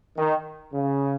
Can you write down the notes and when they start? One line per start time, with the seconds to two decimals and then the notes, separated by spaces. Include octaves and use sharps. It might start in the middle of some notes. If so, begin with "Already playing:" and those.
0.18 D#3
0.74 C#3